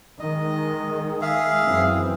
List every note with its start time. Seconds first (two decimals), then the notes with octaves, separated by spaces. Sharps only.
0.20 D#3 G#3 D#5
1.21 G#4 E5 F5
1.64 F#2 E3 C4